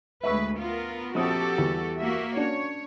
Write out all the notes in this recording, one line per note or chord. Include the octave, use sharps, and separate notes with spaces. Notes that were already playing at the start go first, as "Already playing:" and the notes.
D2 G#3 B4 E5 C#6 E6
B3 F4 A#4
A#1 C4 F#4 G4 A4 D#6
E2 G3
A#3 F#4 E5
C#4 D4 C#5